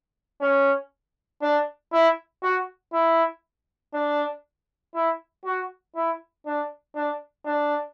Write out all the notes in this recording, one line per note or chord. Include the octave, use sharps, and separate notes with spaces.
C#4
D4
E4
F#4
E4
D4
E4
F#4
E4
D4
D4
D4